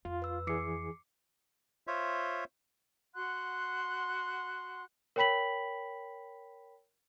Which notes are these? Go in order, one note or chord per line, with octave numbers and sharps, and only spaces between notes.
F2 F4
B4 E6
E3 G#4 D6 C7 C#7
F4 C5 C#5 E5
F#4 F#5 C6 F#6
A#4 C#5 G5 B5 B6 F#7